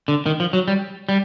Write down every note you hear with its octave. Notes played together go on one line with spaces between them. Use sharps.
D3
D#3
F3
F#3
G3
G3